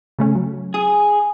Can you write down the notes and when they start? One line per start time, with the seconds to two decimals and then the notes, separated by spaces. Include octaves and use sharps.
0.19 C#3 A3 C#4
0.35 F#3
0.74 G#4 D#6